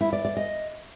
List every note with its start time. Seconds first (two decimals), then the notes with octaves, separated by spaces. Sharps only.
0.01 E4
0.13 D5
0.25 D5
0.37 D#5